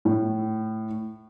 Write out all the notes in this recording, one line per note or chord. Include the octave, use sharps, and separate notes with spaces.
A2